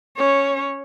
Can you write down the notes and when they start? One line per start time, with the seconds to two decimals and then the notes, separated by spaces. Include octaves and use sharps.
0.17 C#4 C#5